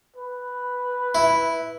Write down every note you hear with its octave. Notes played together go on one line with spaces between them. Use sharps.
B4
E4